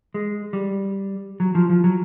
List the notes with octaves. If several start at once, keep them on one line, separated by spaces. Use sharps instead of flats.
G#3
G3
F#3
F3
F3
F#3